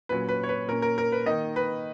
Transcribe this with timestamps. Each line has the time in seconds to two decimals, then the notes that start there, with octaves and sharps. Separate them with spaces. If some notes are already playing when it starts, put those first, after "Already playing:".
0.09 A#2 F#3 C#4 B4
0.29 B4
0.43 C#5
0.49 B4
0.67 A#2 A#3 C#4 A#4
0.82 A#4
0.98 A#4
1.12 B4
1.26 D#3 A#3 D#4 D#5
1.56 B4